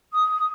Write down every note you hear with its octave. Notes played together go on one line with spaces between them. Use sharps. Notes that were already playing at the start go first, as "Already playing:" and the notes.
D#6